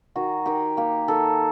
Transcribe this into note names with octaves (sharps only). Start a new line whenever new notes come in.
D#3 F#4
D#3 G4
A#3 G4
D#3 A4